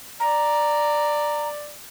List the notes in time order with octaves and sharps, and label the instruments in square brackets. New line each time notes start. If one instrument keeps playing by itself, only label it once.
[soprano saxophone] D5 [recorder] A#5